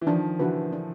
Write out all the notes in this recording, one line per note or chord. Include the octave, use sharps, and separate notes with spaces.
E3
D#3 F3 D4
D3 E3 F#4 B4
D4